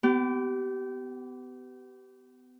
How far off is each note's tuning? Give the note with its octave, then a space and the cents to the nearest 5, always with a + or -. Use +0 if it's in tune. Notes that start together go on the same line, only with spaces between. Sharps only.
B3 +30 G4 -25